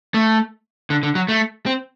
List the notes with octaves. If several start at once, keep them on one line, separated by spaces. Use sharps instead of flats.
A3
D3
D3
F#3
A3
C4